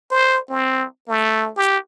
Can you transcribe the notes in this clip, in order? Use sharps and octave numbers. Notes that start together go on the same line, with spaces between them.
C5
C4
A3
G4